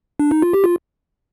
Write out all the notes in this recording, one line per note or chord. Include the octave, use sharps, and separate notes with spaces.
D4
D#4
F4
G4
F4